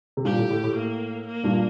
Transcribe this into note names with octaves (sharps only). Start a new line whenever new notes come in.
C3
G2 A#2 G4
A2
A2
A2
A#3
A#3
G2 A#2